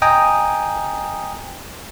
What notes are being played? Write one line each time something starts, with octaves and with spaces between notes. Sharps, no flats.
D#5 G5 G#5 A#5 D#6